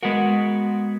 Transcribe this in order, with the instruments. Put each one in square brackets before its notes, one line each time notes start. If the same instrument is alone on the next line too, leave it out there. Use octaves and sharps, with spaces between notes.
[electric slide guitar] G#3 B3 F#4 A#4